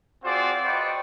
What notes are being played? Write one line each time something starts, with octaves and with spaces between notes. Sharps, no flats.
C4 F4 F#4 G#4 C5 D5
B4 C5 D5 D#5 G5 C#6